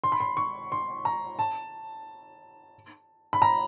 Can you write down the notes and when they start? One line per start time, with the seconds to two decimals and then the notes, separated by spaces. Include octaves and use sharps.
0.04 C6
0.12 B5
0.20 C6
0.37 C#6
0.72 C6
1.05 A#5
1.39 A5
3.33 B5
3.42 A#5